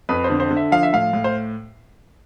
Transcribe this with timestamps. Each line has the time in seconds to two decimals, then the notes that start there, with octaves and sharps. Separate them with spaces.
0.09 F2 B4
0.24 C5
0.30 D3
0.40 C5
0.51 D3
0.57 E5
0.72 F3 F5
0.83 E5
0.93 A2 F5
1.13 A2
1.24 C5